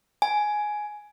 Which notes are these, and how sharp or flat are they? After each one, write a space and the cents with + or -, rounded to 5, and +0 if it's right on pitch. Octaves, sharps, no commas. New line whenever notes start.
G#5 +10